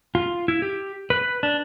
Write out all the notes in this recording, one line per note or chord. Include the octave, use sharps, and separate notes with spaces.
F4
E4
G4
B4
D4